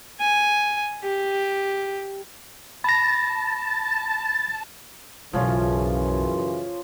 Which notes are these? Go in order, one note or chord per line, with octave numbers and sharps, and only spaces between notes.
G#5
G4
A5 B5 A#6
B1 F#2 C#3 E3 F3 C#4 F4